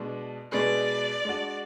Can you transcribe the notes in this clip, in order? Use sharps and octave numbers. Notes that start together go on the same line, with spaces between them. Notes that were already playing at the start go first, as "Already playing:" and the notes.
Already playing: B2 G#3 D4
B2 G#3 D4 G#4 B4 D5
G#3 D4 F#4